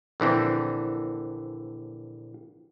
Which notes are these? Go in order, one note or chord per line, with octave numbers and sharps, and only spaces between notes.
A#1 D3 E3 C4